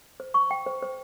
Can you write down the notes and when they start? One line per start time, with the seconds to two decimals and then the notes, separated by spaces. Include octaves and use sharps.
0.20 C5
0.34 C#6
0.51 G5
0.66 C5
0.83 C5